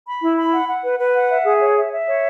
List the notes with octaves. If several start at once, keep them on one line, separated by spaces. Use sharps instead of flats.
B5
E4
B5
F#5
F#5
B4
B4
F#5
E5
G#4
C#5
E5
E5
C#5